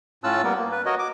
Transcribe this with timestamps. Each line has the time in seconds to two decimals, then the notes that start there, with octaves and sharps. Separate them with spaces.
0.24 A2 C#4 F4 A5 E6 F#6
0.44 G3 A#3 B3 A#4
0.58 A#3
0.72 B4
0.86 F#4 A#4 C#5 D#5
0.99 D6